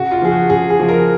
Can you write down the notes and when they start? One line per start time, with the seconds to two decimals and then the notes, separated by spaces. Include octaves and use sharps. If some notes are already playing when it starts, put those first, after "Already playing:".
Already playing: C#3 F#4
0.12 F4
0.22 F3 G#4
0.31 F#4
0.50 C#3 G#4
0.70 G#4
0.80 F3
0.89 A#4